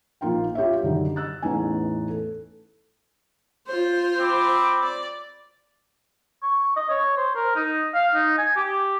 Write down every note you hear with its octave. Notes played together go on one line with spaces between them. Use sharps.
A#1 A#3 D#4 F4 F5 G5
F4 G4 C#5 E5
F#2 D3 D#3 G3
E6 F#6 A6
A1 E2 A2 C#4 D#4 G#5
A4
F4 C5
C4 B5 D6
D5
C#6
D#5
C#5
C5
A#4
D#4
F5
D#4
G#5
G4